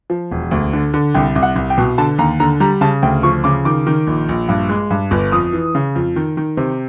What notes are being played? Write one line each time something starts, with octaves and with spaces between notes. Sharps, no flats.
F3
E1
D2
D3
D3
C2 G5
C2
F#5
C2
G5
B2
D3 A5
D#2 A#5
D3 A#5
G3 A#5
C#3 A5
D2 G5
F3 C#6
C#3 D6
D#3 D6
D#3
A#1
A#1
G2
G#3
G2
G1
F2 D#6
E3
C#3
F2
D#3
D#3
C3